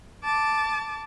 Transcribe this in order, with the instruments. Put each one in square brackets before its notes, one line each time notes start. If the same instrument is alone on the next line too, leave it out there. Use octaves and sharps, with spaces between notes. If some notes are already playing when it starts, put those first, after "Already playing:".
[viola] A5 D6